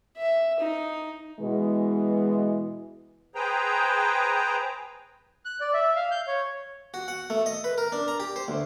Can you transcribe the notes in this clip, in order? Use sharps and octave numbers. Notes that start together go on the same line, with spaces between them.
E5
D#4
B2 E3 G#3
G#4 B4 C5 G5 A#5
F#6
D5
E5
F5
G6
C#5
F#4
F#5
A3
D#5
B4
A#4
D4
A#5
G4
C5
D2